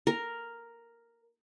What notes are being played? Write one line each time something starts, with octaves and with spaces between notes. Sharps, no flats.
A#4